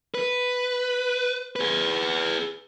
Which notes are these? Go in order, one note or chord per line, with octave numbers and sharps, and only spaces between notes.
B4
G#4 B4